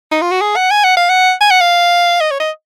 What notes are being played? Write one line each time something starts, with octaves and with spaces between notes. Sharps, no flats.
D#4
F4
F#4
G#4
F#5
G#5
F#5
F5
F#5
G#5
F#5
F5
D#5
C#5
D#5